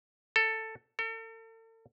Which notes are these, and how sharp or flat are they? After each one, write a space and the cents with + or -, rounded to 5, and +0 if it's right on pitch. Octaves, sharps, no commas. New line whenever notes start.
A4 +10
A4 +40